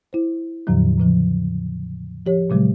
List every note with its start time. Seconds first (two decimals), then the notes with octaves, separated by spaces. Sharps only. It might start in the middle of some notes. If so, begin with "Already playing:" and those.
0.13 E4 C5
0.67 E2 A2 D3 F3 F#3
0.98 A2 C#3 F3
2.26 F3 G4 C#5
2.50 A#2 C#3 F#3 G#3